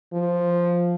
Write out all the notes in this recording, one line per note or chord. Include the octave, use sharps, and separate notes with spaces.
F3